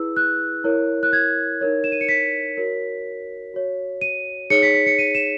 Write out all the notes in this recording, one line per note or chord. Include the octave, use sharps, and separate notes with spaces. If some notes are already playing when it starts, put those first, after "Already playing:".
Already playing: E4 G#4 B4 E6
F#6
E4 A#4 C#5
F#6
G#6
D#4 A#4 C#5
E7
D#7
C#7
B6
F#4 A#4 C#5
F#4 C#5
D#7
D#4 G#4 C#5 C#7
B6
B6
C#7
D#7
E7